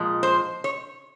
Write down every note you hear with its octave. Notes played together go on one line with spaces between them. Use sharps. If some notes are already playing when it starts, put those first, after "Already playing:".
Already playing: A#2 F3 G#3
C5
C#5